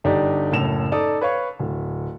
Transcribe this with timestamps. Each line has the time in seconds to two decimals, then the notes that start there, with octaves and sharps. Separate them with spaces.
0.04 G1 D4 D#4 G4 D5
0.52 F#1 A2 A4 E7 F7
0.92 D#4 A4 D5 D#6
1.21 B4 C#5 F5 C#6
1.59 D1